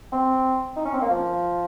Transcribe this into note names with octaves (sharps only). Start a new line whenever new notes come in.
C4
D#4
C#4
C4
A#3
F3